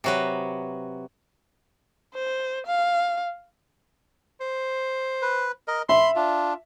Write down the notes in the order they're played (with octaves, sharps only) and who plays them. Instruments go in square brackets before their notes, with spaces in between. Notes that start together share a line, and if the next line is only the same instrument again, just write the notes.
[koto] C3 F#3 B4
[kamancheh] C5
F5
[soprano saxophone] C5
[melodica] B4
A#4 D#5
[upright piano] E5 [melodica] B5 [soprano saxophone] C6
[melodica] D4 [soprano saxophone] F4